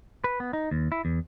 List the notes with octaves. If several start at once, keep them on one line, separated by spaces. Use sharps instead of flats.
B4
B3
D#4
D#2
E4
E2